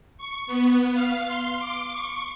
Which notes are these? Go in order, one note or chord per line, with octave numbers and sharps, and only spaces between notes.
C#6
B3
F5
C6
D6
C#6